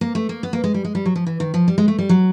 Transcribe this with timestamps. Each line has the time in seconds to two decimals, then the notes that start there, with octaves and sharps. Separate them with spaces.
0.01 A#3
0.15 A3
0.29 A#3
0.43 B3
0.53 A#3
0.64 G#3
0.74 G3
0.85 G#3
0.95 G3
1.05 F#3
1.16 F3
1.27 E3
1.40 D#3
1.54 F3
1.68 G3
1.78 G#3
1.88 A3
1.98 G3
2.09 F#3